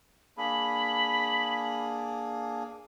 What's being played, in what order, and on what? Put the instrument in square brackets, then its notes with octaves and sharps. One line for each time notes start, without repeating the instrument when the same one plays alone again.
[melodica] A#3 D4 G#4 [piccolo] B5